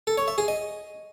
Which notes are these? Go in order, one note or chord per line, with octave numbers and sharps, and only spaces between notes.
A4
C#5
E5
G#4
D#5